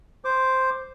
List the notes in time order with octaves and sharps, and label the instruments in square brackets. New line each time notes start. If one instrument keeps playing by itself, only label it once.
[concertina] C5 D6